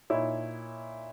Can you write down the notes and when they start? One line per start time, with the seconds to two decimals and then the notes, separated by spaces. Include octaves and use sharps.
0.10 A#2 D#4 E4 C#5